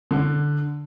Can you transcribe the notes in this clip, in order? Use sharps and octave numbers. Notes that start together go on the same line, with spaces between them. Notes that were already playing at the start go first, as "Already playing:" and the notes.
D3